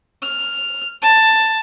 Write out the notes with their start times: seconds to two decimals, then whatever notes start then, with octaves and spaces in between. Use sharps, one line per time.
0.23 F6
1.02 A5